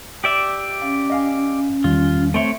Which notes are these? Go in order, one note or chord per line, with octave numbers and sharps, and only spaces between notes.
G4 D5 E5
C#4 F5
D#5 F5 G#5
E2 D#3 G3 F4
A3 C4 C#5 E5